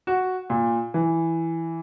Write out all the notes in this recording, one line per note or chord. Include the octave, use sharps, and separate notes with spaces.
F#4
A#2
E3